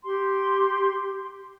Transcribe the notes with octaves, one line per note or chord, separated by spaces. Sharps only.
G4 C6